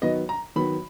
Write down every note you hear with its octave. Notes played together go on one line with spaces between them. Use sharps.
D#3 F#3 B3 D#5
A#5
D#3 F#3 B3 B5